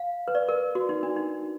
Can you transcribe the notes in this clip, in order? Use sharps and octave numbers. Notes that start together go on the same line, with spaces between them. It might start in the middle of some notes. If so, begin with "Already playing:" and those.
Already playing: F5
B4
D5
A#4
F#4
D#4
D4
D#4